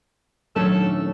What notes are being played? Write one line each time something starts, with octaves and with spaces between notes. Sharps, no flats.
D#1 F#3 A3 C#4 D4 A4 G#6